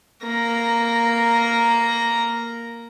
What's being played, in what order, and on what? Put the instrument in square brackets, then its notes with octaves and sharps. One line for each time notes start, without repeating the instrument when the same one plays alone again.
[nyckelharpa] A#3 A#5